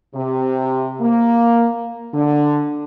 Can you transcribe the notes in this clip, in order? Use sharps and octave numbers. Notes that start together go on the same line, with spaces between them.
C3
A#3
D3